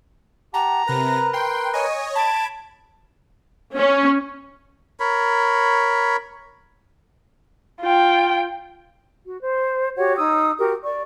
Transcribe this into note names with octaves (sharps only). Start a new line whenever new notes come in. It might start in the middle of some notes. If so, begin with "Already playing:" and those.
G4 F#5 A5 A#5
C3 A#4 B4 F#6 A#6
G5 C6
C#5 D#5 G#5
A5 B5 G#6 D7
C#4
A#4 C#5 B5
F4 G5
F#4
C5
F#4 G4 C#5 F#5
D#4 D#6 E6
F#4 G4 A#4
D5 C#6